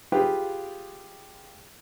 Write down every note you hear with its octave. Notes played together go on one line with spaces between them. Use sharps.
F4 G4 G#4 B4 F5 G5